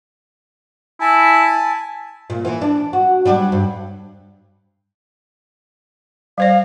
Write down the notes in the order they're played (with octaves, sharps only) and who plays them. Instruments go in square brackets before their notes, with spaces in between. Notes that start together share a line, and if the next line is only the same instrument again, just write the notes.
[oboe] E4 [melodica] G#5 A5
[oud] A#2
E3
D4
F#4
F#3 G3 D4
G2
[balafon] G3 C5 D5 [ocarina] F5